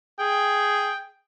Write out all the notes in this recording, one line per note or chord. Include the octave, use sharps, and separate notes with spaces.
G#4 G5